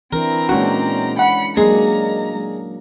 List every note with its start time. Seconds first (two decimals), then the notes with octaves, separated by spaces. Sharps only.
0.13 E3 C4 D4 E4 A#4 A#5
0.49 A#2 G#3 C#4 D4 F#4
1.19 F#5 B5 C#7
1.57 F#3 G#3 A#3 D4 G#4 A#5